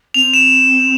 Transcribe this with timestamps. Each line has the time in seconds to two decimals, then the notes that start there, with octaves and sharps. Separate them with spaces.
0.14 C4 F7
0.34 E7